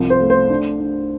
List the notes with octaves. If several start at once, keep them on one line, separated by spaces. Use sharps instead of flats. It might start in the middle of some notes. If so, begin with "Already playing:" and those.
Already playing: C2 F3
C5
A3
C5
D4
D4